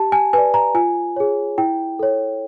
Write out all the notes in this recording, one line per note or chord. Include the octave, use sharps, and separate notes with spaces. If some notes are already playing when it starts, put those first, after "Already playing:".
Already playing: G4 A5
G#5
B4 D5 G#5
A#5
F4 G#5
G#4 C#5
E4 G5
A4 C#5